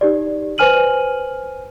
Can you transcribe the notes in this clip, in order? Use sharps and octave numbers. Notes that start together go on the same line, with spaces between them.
D#4 G4 D5
B4 C5 G#5 F6 D#7 F#7